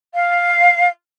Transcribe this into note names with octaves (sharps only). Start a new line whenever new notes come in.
F5